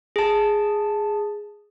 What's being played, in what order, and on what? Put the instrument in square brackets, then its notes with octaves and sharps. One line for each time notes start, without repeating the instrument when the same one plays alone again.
[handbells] G#4 A5